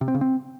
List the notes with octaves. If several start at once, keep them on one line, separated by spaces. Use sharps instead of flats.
C3
C4
C#3
C4